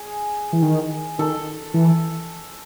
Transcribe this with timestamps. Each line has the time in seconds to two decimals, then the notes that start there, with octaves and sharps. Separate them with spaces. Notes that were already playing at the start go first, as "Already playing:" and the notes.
Already playing: G#4
0.53 E3
0.62 D#3
1.19 D#3 A4
1.74 E3